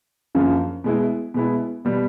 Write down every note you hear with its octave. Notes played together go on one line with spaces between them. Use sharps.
F#2 C#3 F3 A#3
B2 G#3 B3 E4
B2 G#3 B3 E4
B2 G3 B3